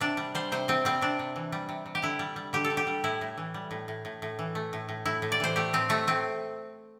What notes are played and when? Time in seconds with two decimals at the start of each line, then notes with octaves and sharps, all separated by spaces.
0.01 C3 D4
0.17 G3
0.35 G3 C5
0.52 C3 C5
0.68 C3 C4
0.85 G3 C4
1.01 C3 D4
1.19 C3
1.36 E3
1.52 G3
1.69 C3
1.86 C3
1.95 G4
2.02 D3 E4
2.19 G3
2.36 G3
2.53 D3 G4
2.64 A4
2.70 D3
2.77 G4
2.87 G3
3.04 A2 E4
3.21 A2
3.38 E3
3.54 G3
3.71 A2
3.88 A2
4.05 A2
4.22 A2
4.39 E3
4.55 A3
4.73 A2
4.89 A2
5.05 A2 E4
5.22 A2
5.32 D5
5.40 E3 C5
5.56 A3 G4
5.73 A2 C4
5.89 A2 A3
6.07 A2 C4